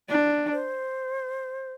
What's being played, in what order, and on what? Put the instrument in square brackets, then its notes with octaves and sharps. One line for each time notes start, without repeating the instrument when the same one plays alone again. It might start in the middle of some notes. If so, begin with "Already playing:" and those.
[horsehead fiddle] D4
[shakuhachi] C5